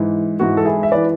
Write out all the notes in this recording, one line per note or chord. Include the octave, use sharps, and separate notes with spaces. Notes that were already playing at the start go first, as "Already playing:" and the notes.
Already playing: G#2 E3
G#2 E3 F#4
A4
E4 G#4
E5
E3 B4 D5